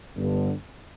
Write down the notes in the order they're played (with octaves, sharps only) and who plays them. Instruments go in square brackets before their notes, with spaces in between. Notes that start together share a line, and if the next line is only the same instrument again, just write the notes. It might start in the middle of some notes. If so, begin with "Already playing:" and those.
[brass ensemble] G1 G2 D3